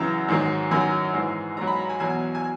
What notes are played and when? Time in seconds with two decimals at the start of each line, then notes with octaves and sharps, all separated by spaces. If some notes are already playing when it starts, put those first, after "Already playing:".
Already playing: F#2 C#3 E3 A#5
0.28 G#2 D#3 F#3
0.71 F#2 D#3 F#3 G#5
1.14 G#2 E3
1.57 G#2 F#3 A#5
1.67 B5
1.79 A#5
1.89 G#5
1.99 E2 B2 F#3 G#5
2.35 G#5